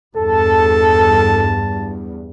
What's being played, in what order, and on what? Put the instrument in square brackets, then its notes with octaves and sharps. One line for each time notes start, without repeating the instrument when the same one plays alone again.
[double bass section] E2 G2 [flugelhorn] A4 [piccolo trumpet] A5